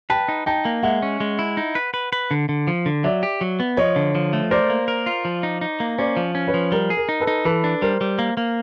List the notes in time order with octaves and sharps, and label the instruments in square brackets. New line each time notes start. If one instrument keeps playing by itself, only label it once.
[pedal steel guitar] B4 [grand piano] G5 A5
[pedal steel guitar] D#4
[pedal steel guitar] D#4 [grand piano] G5 A5
[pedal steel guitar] A#3
[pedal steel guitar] G#3 [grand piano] E5 F#5
[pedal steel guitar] C#4
G#3
E4
D#4
B4
B4
B4
D3
D3
F3
D3
[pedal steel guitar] F#3 [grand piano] D5 E5
[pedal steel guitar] G4
F#3
B3
[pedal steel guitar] F3 [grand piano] C#5 D#5
[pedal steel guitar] D3
F3
A3
[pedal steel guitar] A#4 [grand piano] C5 D5
[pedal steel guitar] A#3
A#4
F4
F3
D#4
D#4
A#3
[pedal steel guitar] C#4 [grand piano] C5 D5
[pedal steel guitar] F3
C#4
[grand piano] B4 C#5
[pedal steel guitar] F3
[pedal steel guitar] G3 [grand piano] A#4
[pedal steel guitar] G#4
[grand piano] A#4
[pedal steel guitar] D#4
[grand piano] A4 B4
[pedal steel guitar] D#4
[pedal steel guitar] E3 [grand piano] A4 B4
[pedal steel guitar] D4
[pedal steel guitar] G3 [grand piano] A#4 C5
[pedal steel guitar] G3
A#3
A#3